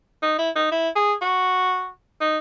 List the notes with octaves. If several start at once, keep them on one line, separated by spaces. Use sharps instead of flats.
D#4
E4
D#4
E4
G#4
F#4
D#4